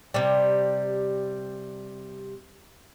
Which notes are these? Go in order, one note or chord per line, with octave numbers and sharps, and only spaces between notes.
C3 G3